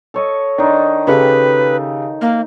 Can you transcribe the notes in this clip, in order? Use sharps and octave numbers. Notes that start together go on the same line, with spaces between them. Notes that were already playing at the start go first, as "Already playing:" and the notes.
A4 C#5 D#5
D#3 D4 D#4 C6
C#3 G4 A4 B4
A#3